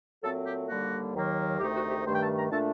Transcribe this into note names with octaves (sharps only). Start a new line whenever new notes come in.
A#2 F#3 A3 C4 A4
G4
D#2 D3 G3 A#3 F#4
D#2 D#3 F#3 A#3
D2 C3 D#3 A3 D#4 G4
F#4
G4
G2 D#3 A3 C5
G5
A5
A#5
A#2 A3 D4 A5